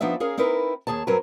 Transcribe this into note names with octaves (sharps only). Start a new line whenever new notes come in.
F3 B3 D4 D#4 E5
C#4 G#4 A#4 F5
C4 D#4 E4 A#4 B4
D#2 G#4 C#5 A5
G2 F#3 C4 A#4 B4